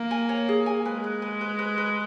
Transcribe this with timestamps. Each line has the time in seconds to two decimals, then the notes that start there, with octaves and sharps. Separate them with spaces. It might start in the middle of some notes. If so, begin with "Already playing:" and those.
Already playing: A#3
0.11 G#5
0.29 C#5
0.49 G#4
0.66 G#5
0.85 G#3 B4
1.04 B4
1.22 B4
1.41 B4
1.59 B4
1.78 B4